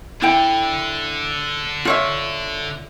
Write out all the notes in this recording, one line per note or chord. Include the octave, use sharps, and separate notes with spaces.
D3 E4 G5
F4 C#5 E5